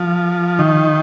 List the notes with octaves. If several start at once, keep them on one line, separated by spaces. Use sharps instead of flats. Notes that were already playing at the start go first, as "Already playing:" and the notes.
Already playing: F3
D#3